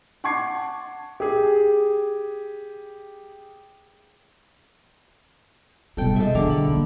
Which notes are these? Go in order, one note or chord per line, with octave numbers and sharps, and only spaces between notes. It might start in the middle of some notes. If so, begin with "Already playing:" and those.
F#5 A5 C#6 D6 G#6 C7
G4 G#4
B2 G3 A4 G5
G#3 A4 E5
D3 E3 A#5 D6
B5
B1 A#3